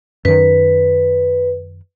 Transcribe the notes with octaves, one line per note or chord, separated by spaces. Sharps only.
F#2 D#3 B4